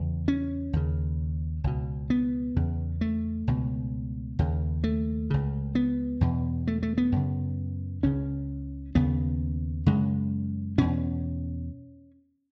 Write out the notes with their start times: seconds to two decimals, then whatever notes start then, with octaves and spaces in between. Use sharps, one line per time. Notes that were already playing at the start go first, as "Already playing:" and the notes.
Already playing: E2 C#3
0.28 C#4
0.73 D#2 C#3
1.64 C#2 B2
2.10 B3
2.56 E2 C#3
3.01 A3
3.47 C#2 B2
4.39 D#2 C#3
4.84 A3
5.30 C#2 C#3
5.75 B3
6.21 E2 B2
6.67 A3
6.83 A3
6.98 B3
7.12 F#2 C#3
8.03 C#2 C#3 C#4
8.95 D#2 C#3 B3
9.86 F#2 C#3 G#3
10.78 E2 B2 C#4